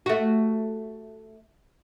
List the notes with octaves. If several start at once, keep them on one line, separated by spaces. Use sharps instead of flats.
A3 F#4